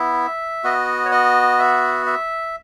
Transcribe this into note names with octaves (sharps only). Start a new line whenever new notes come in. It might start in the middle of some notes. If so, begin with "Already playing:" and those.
Already playing: B3 E4 E5
B3 F#4 D#5
C#5
D#5
E5
E5